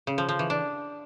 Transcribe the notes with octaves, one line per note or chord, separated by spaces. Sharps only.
C#3
F3
F3
E3
D4